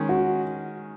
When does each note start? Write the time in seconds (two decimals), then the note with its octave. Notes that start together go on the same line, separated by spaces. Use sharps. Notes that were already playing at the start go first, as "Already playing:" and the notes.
Already playing: D#3 G#3 C#4 G#4
0.09 F#4